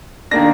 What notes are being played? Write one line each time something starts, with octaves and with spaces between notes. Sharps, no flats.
D#3 A#3 D4 A#6